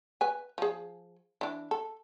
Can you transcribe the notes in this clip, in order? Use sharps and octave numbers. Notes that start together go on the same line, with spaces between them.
B4 G#5
F3 G#4
E3 D4
A4